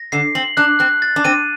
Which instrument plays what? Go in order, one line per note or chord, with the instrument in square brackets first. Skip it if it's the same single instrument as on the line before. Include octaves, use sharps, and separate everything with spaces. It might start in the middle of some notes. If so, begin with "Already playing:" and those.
Already playing: [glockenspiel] A#6
[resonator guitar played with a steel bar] D3 [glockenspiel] C7
[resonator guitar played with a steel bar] C4 [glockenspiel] F#7
[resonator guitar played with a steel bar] D4 [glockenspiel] F#6
[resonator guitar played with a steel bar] C4 [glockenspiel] F#6
[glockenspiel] A6
[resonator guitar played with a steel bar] D4
[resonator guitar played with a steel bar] C4 [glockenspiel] D#7